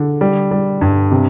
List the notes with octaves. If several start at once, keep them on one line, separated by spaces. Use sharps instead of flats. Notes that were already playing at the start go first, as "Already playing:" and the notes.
Already playing: D3
G3
G3
G2
C3